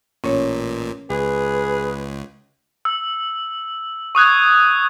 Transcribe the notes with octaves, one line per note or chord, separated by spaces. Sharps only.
A1 A#2 C#4 C#5
C#2 G#4 B4
E6
C#6 D#6 F#6 G#6